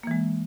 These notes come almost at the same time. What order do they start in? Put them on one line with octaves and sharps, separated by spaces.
A#3 E3 G#3